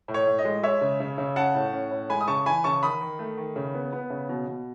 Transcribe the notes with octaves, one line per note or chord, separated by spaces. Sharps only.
A2
C#5
A2
D#5
G#3
G#3 C#5 E5
C#3
C#3
C#3
C#4 F#5 A5
A2
C#4
A2
G#3 G#5 B5
D#6
C#3 A5 C#6
E3 G#5 B5
C#3 A5 C#6
D#3 B5 D#6
D#3
A3
D#3
C#3
B3
B3
C#3
B2
B2